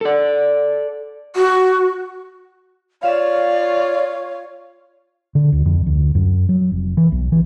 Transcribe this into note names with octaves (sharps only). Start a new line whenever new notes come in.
A4 D5
F#4
F4 C#5 D5 F5 E7
D3
D2
F2
D2
F#2
F#3
F1
E3
B1
E3